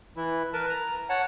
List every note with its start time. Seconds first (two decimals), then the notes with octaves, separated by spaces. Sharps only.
0.16 E3 E4
0.53 A#4 B4 A5
0.69 A#5
1.09 C#5 F#5 A5